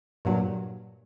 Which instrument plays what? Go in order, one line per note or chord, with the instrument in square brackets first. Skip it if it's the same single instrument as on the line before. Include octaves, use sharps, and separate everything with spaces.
[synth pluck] G2 A#2 F#3